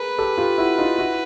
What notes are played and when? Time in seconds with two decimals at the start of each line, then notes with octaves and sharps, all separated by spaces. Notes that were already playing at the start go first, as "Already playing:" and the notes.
Already playing: G#4 A#4 B4
0.18 G4 A4
0.37 F4 G4
0.58 E4 F#4
0.78 D#4 F4
0.98 E4 F#4